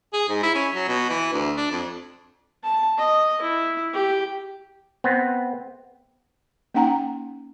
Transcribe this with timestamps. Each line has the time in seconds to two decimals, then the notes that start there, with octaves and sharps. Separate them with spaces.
0.13 G#4
0.29 G#2
0.43 E4
0.55 C#4
0.74 F#3
0.88 B2
1.10 E3
1.33 D2
1.57 D4
1.72 F2
2.64 A5
2.98 D#5
3.42 E4
3.94 G4
5.04 B3 C4
6.74 A#3 C#4 D#4 F#5 G5 A#5